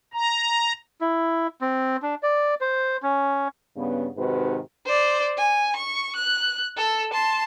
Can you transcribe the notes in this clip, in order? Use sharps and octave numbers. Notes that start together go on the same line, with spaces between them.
A#5
E4
C4
D4
D5
C5
C#4
G2 C#3 B3
G#2 C3 D#3 F#4 B4
C5 D5
G#5
C#6
F#6
A4 E6
A5 C6